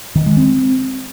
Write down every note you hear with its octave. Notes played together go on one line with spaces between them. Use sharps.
D#3
G#3
C4